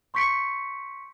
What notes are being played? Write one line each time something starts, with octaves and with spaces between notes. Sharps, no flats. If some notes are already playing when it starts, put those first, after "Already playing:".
C6 C#6 G6 B6 C#7 D7